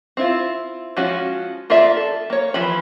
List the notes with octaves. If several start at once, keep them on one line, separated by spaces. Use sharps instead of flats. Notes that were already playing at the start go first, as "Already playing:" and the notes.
C4 E4 F4
F3 G#3 C#4 F#4
A#3 F4 G#4 D5 E5
A4
A#3 C#5
E3 F3 B5